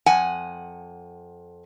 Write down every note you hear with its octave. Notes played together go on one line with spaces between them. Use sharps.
F2 F#5 G#5